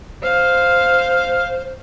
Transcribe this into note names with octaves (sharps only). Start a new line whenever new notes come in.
C5 F5